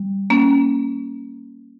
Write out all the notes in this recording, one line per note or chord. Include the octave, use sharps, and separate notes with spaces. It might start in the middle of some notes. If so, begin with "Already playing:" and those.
Already playing: G3
A#3 C#4